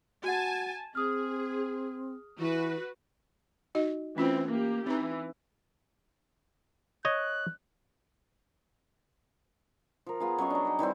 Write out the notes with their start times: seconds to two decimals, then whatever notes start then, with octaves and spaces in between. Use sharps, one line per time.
0.24 F#4 F#5 G#5 A5
0.95 C4 G#4 D#6 F6
2.39 E3 F#4 B4
3.75 D#4 F#4 D#5
4.17 E3 A3 C4 C#4 F4
4.48 A#3 G4
4.86 E3 C4 D#4 A#5
7.05 C#5 D#5 F#6
10.06 F3 A#4
10.20 B3 F4 G#4
10.38 F#3 C#4 D#5 C#6
10.50 D4 A#5
10.65 D#4 D#5
10.79 D#3 E3 G3 C4